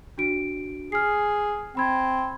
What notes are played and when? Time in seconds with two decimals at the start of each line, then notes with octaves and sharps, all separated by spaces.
0.18 D4 F#4 D7
0.92 G#4 F6 C7
1.75 C4 G5 B5 G#6